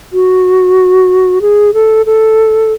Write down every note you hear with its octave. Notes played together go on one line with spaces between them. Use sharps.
F#4
G#4
A4
A4